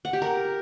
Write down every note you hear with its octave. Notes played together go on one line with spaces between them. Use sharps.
F#5
G4
A#4